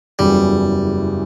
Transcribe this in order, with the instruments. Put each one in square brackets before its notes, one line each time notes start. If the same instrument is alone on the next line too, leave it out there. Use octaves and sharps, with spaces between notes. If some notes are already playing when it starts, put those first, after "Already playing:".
[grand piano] F#1 E2 C#3 F#3 [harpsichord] G3